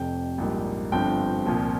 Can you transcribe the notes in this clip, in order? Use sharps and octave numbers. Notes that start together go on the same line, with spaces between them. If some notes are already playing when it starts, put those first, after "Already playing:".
Already playing: F1 F2 C3 G5
A#1 G#2 G3 A#3
G1 G2 F3 C4 G5
C2 A#2 F3